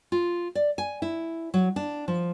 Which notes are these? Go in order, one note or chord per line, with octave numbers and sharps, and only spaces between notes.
F4
D5
G#5
E4
F#3
D4
F3